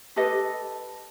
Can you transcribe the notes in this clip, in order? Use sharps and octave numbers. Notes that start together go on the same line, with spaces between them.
G4 A4 B4 D#5